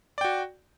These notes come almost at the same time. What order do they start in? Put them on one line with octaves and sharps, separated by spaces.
D5 G5 F#4